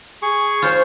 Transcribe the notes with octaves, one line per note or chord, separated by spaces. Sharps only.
G#4 C#6
F4 C5 C#5